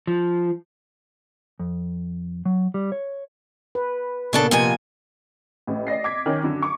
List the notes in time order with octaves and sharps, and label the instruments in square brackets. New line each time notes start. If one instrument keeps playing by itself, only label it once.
[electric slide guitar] F3
[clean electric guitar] F2
F#3
G3
C#5
[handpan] B4
[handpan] A#2 A#3 B3 [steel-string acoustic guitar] C#3 D4 A4
[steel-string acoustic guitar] F2 C3 G#5
[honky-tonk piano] A1 A2
D5 D#5 A#6 C7
D6 G#6 B6
D#3 C#4
F#2 D3
C#6 D6